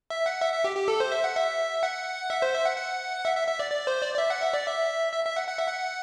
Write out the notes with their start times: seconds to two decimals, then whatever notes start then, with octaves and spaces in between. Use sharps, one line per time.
0.10 E5
0.26 F#5
0.41 E5
0.54 E5
0.64 G4
0.76 G4
0.88 A4
1.00 C5
1.12 E5
1.24 F#5
1.35 E5
1.83 F#5
2.30 E5
2.42 C5
2.54 E5
2.65 F#5
2.77 F#5
3.25 E5
3.37 E5
3.47 E5
3.59 D5
3.71 D5
3.87 C5
4.02 D5
4.14 D5
4.18 E5
4.30 F#5
4.42 E5
4.54 D5
4.66 E5
5.13 E5
5.25 E5
5.36 F#5
5.48 F#5
5.58 E5
5.68 F#5